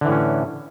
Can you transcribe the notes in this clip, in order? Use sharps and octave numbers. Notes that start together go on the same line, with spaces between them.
A2 D3 E3 C#4